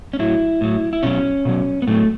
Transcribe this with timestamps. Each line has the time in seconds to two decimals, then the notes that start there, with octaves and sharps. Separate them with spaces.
0.13 C#4
0.19 A2 F#3 E4
0.61 A2 F#3
0.93 E4
1.03 B2 F#3 C#4
1.45 B2 F#3
1.82 B3
1.87 A2 F#3 A3